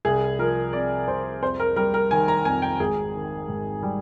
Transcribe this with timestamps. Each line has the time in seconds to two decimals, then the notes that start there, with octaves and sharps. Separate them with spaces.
0.05 C2 G#4
0.39 F3 A#4
0.73 C3 D5
1.08 C2 C5
1.42 F2 C5
1.60 A#4
1.76 G3 A#4
1.94 A#4
2.11 D#3 G#5
2.28 A#5
2.45 F2 G#5
2.62 G5
2.80 G#1 G#4
3.15 D#3
3.48 G#2
3.82 G3